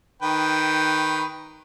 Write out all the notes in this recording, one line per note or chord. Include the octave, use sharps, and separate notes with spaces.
D#3 B4 G5